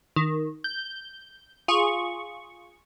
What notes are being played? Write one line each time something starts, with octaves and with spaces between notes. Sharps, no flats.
D#3
G6
F4 G#4 C#6